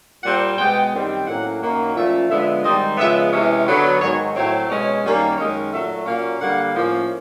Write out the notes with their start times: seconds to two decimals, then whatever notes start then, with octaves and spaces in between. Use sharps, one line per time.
0.24 A#2 G3 C4 F#5
0.58 B2 G#3 B3 G5
0.92 F#2 D#3 G3 C4
1.27 A2 F#3 A#3 C#4 F#5
1.61 F#2 D#3 F#3 A#3
1.95 A#2 F3 A3 C#4 E5
2.29 D3 F3 G#3 B3 E5
2.63 G#2 D#3 G3 C4 D#5
2.97 C#3 F3 G#3 B3 E5
3.32 C3 E3 G#3 C#4 E5
3.67 D3 F#3 B3
4.00 G#2 D#3 F#3 C#5
4.34 A2 F#3 A3 C4 C#5
4.69 B2 G#3 C#4 C#5
5.03 F#2 D#3 G3 A#3 C#4
5.38 F#2 D#3 G#3 C#4 D#5
5.71 A#2 F#3 A3 E5
6.06 A#2 F#3 A#3 C#4 F5
6.40 D3 G3 A#3 F#5
6.74 A2 F3 A#3 C#4